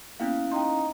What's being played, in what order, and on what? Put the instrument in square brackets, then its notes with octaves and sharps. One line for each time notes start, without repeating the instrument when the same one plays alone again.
[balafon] A#3 B3 [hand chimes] C#4 E4 F5
[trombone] D#4 [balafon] G5 C6